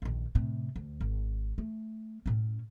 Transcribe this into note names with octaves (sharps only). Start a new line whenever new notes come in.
A#1 D#2
A2 C3
D2
G#1
A3
A2 C#4